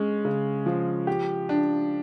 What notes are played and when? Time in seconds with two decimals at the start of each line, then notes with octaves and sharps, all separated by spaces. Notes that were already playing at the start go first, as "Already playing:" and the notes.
Already playing: G#3 C#4
0.25 C#3
0.66 F3
1.07 G4
1.49 D4